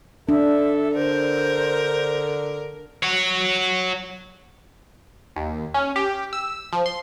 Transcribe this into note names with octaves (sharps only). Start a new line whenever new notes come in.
D4 A4 E5
D3 A#4 C5
F#4 C#5
D#2
C#4
G4
E6
F3
C6